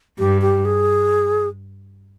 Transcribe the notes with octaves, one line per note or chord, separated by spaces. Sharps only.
G2 G4
G4
G#4